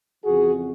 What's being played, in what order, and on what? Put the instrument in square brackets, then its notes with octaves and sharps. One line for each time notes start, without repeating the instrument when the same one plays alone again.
[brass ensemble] F2 C#3 E3 F#4 G#4